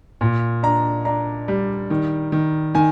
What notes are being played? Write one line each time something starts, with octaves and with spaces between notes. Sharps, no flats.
A#2
D4 A#5
D4 A#5
G3
D#3
D#3
D#3 G#5